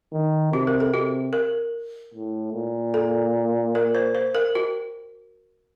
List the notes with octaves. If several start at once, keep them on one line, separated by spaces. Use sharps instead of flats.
D#3
C3 F#4
A#4
A4
C3 F#4
A#4
A2
A#2
A4
A#4
C5
C5
A#4
F#4